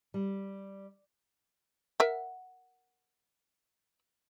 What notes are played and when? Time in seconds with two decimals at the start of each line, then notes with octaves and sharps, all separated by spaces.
0.14 G3
2.00 A#4 E5 F#5